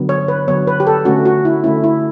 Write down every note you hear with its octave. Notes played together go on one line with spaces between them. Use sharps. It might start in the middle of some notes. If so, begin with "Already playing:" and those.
Already playing: D3 F#3 B3
C#5
B4
D3 F#3 B3 C#5
B4
G4
A4
D3 A3 C#4 F#4
F#4
E4
D3 A3 C#4 E4
E4